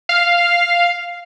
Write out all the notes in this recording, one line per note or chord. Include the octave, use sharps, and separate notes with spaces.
F5